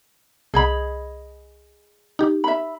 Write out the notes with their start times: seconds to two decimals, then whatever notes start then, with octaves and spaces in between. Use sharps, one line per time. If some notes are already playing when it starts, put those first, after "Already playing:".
0.54 C2 G#4 D#5 B5 G#6
2.19 D#4 G4
2.44 E5 B5